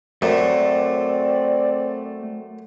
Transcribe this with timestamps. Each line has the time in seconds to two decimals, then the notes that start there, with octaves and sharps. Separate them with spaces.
0.22 F#2 A3 C4 D5